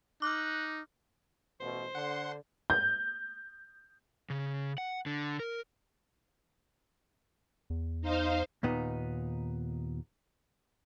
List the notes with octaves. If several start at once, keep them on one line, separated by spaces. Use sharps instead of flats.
D#4 D6 F6 F#6
A1 B2 C5
D3 F#5 C6
G6
C#3
F#5
D3
A#4
E2
D#4 C5 F5
D#2 A#2 B3 D#4